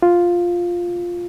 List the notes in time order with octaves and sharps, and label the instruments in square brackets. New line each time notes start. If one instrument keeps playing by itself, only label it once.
[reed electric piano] F4